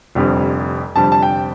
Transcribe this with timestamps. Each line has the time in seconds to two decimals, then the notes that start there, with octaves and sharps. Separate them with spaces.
0.15 F1 F2 D3 G3 C4
0.95 F1 F2 D3 G3 C4 A5
1.12 A5
1.22 G5